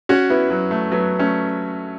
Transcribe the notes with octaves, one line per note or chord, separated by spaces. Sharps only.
C#4 F#4
B3 E4
F#3
A3
F#3 B3
A3 C#4